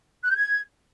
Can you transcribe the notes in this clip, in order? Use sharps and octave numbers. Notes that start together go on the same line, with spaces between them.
F#6
G6
G#6